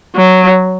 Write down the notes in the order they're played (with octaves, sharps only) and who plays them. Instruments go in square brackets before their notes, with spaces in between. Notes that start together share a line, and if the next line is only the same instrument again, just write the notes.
[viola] F#3